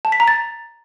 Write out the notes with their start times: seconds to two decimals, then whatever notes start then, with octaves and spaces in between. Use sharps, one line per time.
0.05 A5
0.12 B6
0.20 A#5
0.28 A6